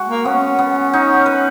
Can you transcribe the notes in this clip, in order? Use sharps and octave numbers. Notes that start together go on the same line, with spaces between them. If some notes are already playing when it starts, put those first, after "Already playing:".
Already playing: G#3 F#4
A#3
B3 C#4
B3
D#4
B4